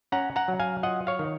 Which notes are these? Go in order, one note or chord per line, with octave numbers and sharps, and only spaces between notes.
C#4 F#5 A#5
F#5 A#5
F#3
F5 G#5
F4 D#5 F#5
C#5 F5
D#3